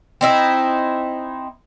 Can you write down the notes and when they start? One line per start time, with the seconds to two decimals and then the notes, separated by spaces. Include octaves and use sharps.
0.21 C4 D#4 E4